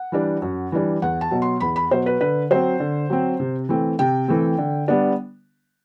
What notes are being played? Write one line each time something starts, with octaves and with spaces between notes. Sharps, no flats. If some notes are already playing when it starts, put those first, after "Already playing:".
Already playing: F#5
E3 G3 D4
F#2
E3 G3 D4
E2 F#5
A5
B2 F#3
C6
E2 B5
B5
B2 F#3 C5
B4
D3 B4
F#3 C4 C5
D3
F#3 C4
C3
E3 A3 C4
C3 G5
E3 A3 C4
D3
G3 B3 D4